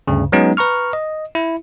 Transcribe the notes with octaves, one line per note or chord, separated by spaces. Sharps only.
D2 G2 C#3
F#3 G#3 B3 C#4 D#4
B4 A#5 C#6 F6
D#5
E4